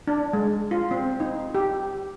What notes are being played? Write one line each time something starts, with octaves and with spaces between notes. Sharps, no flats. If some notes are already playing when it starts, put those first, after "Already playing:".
D4
G#3
F4
C4
D#4
G4